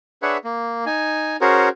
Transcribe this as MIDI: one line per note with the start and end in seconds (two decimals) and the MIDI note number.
0.22 0.37 62
0.22 0.37 68
0.22 0.37 71
0.22 0.37 73
0.22 0.37 76
0.22 0.37 78
0.44 0.85 58
0.86 1.37 63
0.86 1.37 80
1.41 1.69 61
1.41 1.69 66
1.41 1.69 68
1.41 1.69 70
1.41 1.69 72
1.41 1.69 73